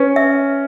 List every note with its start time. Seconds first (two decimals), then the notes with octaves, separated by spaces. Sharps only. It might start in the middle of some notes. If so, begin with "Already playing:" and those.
Already playing: C#4 B4
0.16 E5